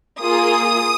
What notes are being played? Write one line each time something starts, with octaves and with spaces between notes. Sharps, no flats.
A#3 F4 G#4 D#6